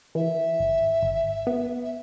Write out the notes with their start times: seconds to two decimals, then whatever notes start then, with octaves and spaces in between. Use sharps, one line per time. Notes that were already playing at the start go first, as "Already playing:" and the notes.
0.15 E3 E5
0.60 G#1
1.02 G#1
1.47 B3
1.85 E5